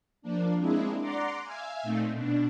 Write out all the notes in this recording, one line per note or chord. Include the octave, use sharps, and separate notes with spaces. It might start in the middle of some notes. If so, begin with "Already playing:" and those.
F3 A#3 D4
G#3 A#3 C4 D4 E4 G#4
D5 F#5 A#5 C6 D6
E5 F5 G#5
A#2 A3 C4 D#4
B2 D4